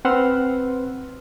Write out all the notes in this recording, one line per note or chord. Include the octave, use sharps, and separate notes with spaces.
C4 B4 F#5 C6 E6 F6